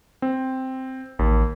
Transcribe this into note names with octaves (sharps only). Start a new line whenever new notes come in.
C4
A1 D#2